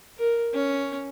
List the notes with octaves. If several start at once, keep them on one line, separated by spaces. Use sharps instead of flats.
A#4
C#4